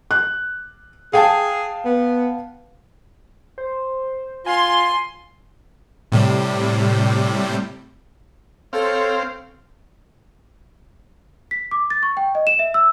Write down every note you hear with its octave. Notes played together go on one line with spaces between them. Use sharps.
F#6
G#4 F5 G5 A5
B3
C5
F4 G#5 C6
A2 C3 G3
C4 A4 C#5 F5
B6
D6
A6
C#6
G5
D#5
E7
E5
E6